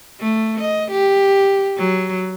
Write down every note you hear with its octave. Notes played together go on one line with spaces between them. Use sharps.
A3
D#5
G4
F#3